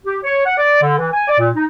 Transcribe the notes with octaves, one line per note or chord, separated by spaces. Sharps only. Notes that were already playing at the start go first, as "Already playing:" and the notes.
G4
C#5
F#5
D5
D3
E3
G#5
D5
A#2
D#4